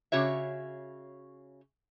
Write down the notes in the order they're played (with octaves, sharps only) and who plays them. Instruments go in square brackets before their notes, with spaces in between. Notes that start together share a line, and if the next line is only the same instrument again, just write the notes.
[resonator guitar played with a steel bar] C#3 F#4 C#5 E5